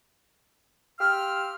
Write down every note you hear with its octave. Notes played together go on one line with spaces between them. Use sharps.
G4 F5 C6 E6 F6